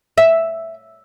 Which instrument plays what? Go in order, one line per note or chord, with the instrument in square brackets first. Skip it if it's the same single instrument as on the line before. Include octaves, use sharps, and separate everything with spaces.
[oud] E5